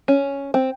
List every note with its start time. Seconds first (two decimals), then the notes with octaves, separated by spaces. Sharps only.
0.08 C#4
0.54 C4